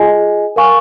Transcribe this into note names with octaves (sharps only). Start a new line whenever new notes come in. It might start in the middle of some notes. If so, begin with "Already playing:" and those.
Already playing: F4 G#4 D#5 G#5
A#4 F5 G#5 C#6